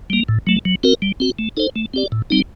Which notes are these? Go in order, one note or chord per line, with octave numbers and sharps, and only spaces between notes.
G3 A#3
A2
F#3 A3
F#3
C4 F#4 A#4
G3
C4 F#4
A3
D#4 A4 C5
A3
C4 G4 D5
A2
G3 C4 D#4